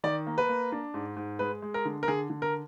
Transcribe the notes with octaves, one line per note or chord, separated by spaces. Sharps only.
D#3 D5
A#3
B4
A#3
D4
G#2
G#2
G#3 B4
G#3
A#4
D3
A#4
D3 G#4
D3
A#4